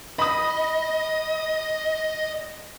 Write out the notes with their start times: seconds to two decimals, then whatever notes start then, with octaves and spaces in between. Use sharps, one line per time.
0.19 D#5 B5 D#6